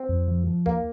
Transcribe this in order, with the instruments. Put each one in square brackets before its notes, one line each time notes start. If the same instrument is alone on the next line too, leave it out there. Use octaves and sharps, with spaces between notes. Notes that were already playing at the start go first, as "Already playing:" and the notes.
Already playing: [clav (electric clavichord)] C4
[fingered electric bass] F2
F3
F3
[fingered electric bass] D#2 [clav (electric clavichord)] A#3